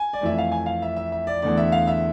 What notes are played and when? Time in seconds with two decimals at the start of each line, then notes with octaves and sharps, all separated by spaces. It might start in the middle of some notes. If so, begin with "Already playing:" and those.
Already playing: G#5
0.13 D5
0.21 F2 E3 A3 E5
0.38 F5
0.52 G#5
0.66 F5
0.82 E5
0.96 E5
1.12 E5
1.27 D5
1.42 E2 D3 A3 D5
1.57 E5
1.72 F5
1.87 E5